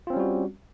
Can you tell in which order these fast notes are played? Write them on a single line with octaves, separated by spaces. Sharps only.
F4 C4 C#4 G3 F#4